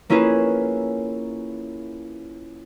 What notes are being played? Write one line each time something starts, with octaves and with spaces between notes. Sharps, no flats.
A#3 C#4 E4 F4 G#4 B4